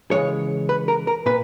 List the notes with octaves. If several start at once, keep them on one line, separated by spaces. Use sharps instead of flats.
C#3 E3 G#3 C#5
B4
A#4
A#4
A#2 B4